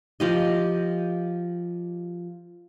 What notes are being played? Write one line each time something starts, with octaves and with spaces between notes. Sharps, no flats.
F3 G4 D#5